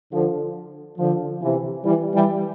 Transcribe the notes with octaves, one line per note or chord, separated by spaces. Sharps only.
D3 F3
D3 F3
C3 E3
E3 G3
E3 G3